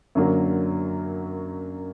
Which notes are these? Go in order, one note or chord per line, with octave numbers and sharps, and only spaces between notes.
F#2 D3 F#3 A#3